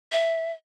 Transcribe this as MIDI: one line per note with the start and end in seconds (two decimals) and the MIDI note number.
0.12 0.52 76